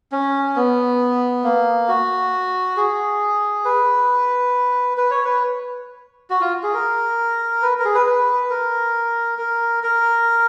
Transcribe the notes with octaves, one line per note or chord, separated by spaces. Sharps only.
C#4
B3
A#3
F#4
G#4
B4
B4
C#5
B4
F#4
F4
G#4
A#4
B4
A#4
G#4
B4
B4
A#4
A#4
A#4